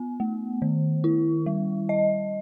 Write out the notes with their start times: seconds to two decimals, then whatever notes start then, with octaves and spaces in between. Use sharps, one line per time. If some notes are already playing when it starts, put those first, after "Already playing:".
Already playing: B3
0.20 A3
0.62 D#3
1.04 E4
1.46 G3
1.89 D#5